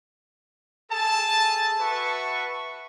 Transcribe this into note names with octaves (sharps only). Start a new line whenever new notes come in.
G#4 A4 A5
F#4 B4 E5 A5 C#6